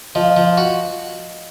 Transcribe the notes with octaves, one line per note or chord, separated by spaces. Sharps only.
F3 D#5
F5
D#5
F3
F5
F#4